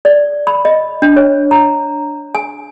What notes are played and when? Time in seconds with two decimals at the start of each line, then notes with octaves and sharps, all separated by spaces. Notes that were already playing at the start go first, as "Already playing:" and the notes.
0.05 D5
0.47 B5
0.65 D#5
1.02 D4
1.16 C#5
1.51 A#5
2.35 G#5